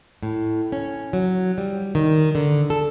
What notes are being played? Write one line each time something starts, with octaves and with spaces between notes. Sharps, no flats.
A2
C#4
F#3
G3
D#3
D3
A4